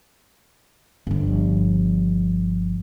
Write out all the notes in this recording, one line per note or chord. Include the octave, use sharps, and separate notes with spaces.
G1 F3